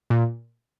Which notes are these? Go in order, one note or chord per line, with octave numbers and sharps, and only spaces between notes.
A#2